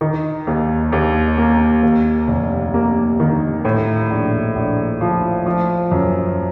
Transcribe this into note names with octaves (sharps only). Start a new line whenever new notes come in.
D#3
D#2
D#2
A#3
D#2
F1
A#3
D#3
A2
A#1
A#1
F3
F3
F#2